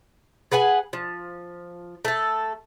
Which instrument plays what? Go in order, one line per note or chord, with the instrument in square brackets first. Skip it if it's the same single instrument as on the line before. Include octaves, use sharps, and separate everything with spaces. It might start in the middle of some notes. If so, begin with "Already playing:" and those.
[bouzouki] G#4 B4 F#5 G#5
F3
A3 A4